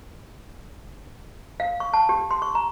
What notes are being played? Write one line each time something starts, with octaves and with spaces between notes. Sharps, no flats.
F5
C#6
A5
G4
C6
C#6
A#5